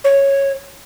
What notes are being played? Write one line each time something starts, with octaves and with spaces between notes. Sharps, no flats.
C#5